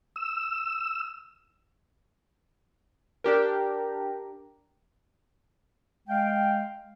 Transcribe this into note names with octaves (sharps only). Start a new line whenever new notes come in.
E6
D4 G4 A#4
G#3 F5 G5